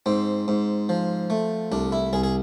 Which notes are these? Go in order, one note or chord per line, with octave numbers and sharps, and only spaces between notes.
G#2 C4
G#2
F3
A3
C2 D4
E4
C2 G#4
G#4